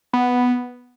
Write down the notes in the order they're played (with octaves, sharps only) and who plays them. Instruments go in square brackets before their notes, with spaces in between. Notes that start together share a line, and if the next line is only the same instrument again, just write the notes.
[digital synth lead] B3